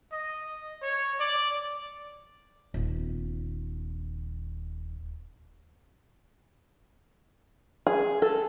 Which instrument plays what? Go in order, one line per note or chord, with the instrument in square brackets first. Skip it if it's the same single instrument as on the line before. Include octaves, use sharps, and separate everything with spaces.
[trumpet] D#5
C#5
D5
[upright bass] D#1 B3
[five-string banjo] G#4
A4